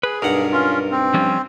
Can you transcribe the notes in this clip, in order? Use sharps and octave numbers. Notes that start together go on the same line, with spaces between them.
G#4 B4
B1 G2 A#4 F#5
C#4 F4
C4
F3 G3 C#4